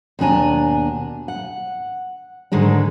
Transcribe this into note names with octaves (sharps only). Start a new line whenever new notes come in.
D#2 B2 D4 G#5 A#5
F#5
G#2 D3 D#3 G#3 D4